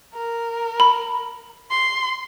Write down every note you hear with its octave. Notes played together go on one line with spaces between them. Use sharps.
A#4
B5
C6